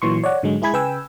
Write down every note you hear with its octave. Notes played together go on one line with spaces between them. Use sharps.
A#2 E3 F#3 C6 C#6
C#5 D5 F#5
G#2 D3 F#3 G#3
G#3 E4 G#4 B5 G#6
C#3 B4 G5 G#5 E6